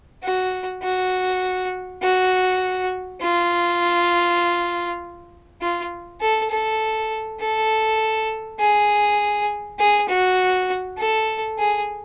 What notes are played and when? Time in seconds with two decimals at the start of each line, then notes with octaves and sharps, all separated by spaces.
0.23 F#4
0.83 F#4
2.02 F#4
3.22 F4
5.61 F4
6.21 A4
6.50 A4
7.40 A4
8.60 G#4
9.79 G#4
10.09 F#4
10.98 A4
11.58 G#4